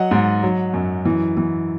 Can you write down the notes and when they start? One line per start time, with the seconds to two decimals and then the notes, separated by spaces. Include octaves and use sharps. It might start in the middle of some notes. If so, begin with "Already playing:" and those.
Already playing: F#3 D#5 F#5
0.11 G#2
0.43 F#3
0.73 F#2
1.05 E3
1.37 E3